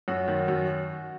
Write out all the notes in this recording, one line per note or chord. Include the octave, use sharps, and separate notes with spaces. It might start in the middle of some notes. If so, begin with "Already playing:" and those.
F#2 F#4
D#3
F#2